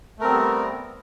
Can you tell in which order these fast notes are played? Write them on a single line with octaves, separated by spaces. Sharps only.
A3 A#4 C4 G3 B3